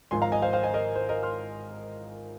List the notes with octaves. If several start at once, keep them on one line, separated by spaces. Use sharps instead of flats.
G#1 G#2 F3 G#5 C6
F5 A#5
D#5 G#5
C5 F5
C5 F5
D#5 G#5
A#4 D#5
C5
A#4 D#5
C6 F6